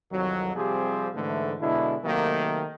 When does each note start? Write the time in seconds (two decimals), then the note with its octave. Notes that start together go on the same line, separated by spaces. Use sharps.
0.12 C2 F2 D#3 F#3
0.55 C3 F3 G3 C4 G4 G#4
1.15 G#2 D3 E3 A3
1.60 B2 D3 G#3 D4 E4
2.04 C3 D#3 F#3 A3 A#3